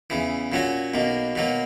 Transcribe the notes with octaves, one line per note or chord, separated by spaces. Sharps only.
E2 C#3 E3
A#2 F#3 C#4 F#4
B1 B2 A#3
B2 F#3 A#3